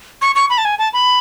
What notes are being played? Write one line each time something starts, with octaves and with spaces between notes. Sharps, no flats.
C#6
C#6
B5
A5
G#5
A5
B5